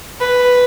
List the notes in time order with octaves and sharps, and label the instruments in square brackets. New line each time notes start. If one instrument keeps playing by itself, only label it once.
[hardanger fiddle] B4